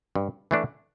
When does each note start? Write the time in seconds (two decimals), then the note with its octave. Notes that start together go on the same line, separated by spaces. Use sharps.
0.15 G2
0.51 E3 A3 D4